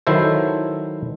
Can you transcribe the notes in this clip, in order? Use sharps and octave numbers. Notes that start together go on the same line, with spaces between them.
D#3 F#3 E4 A4 C5